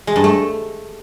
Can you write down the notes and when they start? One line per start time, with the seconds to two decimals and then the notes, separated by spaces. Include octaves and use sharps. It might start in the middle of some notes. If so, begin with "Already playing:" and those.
0.07 G#3
0.16 G2
0.24 A3